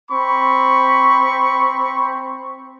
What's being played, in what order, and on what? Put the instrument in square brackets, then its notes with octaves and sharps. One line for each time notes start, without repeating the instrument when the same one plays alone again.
[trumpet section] C4 B5 C#6